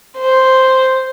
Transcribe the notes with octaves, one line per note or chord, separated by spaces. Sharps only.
C5